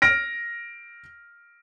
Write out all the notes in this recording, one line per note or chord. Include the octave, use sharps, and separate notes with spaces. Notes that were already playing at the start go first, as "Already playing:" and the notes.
F6 A#6 D7